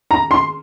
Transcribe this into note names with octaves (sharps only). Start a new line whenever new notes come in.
A#5
C6